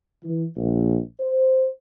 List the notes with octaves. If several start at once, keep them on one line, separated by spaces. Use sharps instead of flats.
E3
A#1
C5